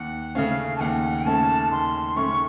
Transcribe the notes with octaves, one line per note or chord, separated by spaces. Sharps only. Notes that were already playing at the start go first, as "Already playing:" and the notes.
Already playing: D#2 F#5
C#3 A3 C#4 F5
A5
D#2 F#5
C#3 A3 C#4 A5
D#2 C6
C#3 A3 C#4 C#6